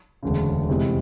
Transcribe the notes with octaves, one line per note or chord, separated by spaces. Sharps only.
E1 D2 C#3
F1 E2 C3 E3 G#3